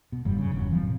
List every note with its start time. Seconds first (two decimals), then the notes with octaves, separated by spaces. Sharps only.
0.12 B2
0.25 F1 G2 F#3 G3
0.38 C#3
0.51 E1 F#3
0.71 E3 F3 C4
0.83 A2 C3